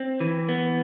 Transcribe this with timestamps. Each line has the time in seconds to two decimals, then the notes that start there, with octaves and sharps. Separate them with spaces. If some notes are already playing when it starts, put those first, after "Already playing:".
Already playing: C4
0.21 E3
0.48 B3